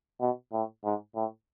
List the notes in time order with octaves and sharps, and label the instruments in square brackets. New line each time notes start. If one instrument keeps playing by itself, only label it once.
[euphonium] B2
A2
G#2
A2